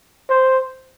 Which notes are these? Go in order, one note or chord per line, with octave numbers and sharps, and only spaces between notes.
C5